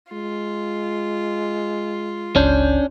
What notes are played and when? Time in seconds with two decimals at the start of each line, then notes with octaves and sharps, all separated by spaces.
0.12 G#3 F4
2.36 G1 C#2 C#4 D4 G6